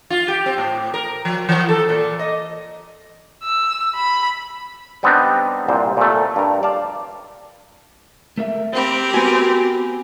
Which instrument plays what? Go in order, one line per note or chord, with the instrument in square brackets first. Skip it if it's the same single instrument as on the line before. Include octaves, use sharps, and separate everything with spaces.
[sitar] F4
G4
C4
A2
A#4
F3
E3
A4
A#2
D#5
[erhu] E6
B5
[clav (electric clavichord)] G3 B3 C4 D4 D#4 G4
C2 A#2 C5
A#2 A3
G2 A#4
D5 F5 A5
[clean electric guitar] A3 A#4 E5
[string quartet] C4 G4 A#4 [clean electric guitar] C5 B5
[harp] B3 G#5 [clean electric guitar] F#4